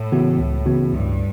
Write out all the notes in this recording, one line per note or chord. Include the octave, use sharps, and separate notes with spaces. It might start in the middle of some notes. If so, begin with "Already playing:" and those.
Already playing: A2
C#3 E3 B3 F#4
C#2
C#3 E3 B3 F#4
C#2 G2